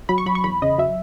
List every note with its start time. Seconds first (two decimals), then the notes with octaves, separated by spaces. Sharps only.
0.09 F#3 B5
0.18 C#6
0.26 F#3 B5
0.35 C#6
0.44 E2 B5
0.62 C#3 D#5
0.78 F#3 E5